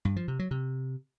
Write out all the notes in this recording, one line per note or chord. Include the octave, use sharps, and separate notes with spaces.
G2
F3
C3
F#3
C3